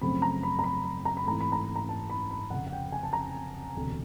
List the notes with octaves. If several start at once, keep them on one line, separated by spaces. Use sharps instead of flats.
F#2 C#3 F3 A3 C4 B5
A#5
B5
A#5
B5
B5
A#5
B5
G#2 E3 A3 C4 A#5
B5
A#5
B5
A#5
A5
B5
B5
F1 F2 C#3 F#5
F#5
G5
G#5
A5
A#5
E1 D2 C3